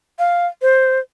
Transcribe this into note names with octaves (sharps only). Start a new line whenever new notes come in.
F5
C5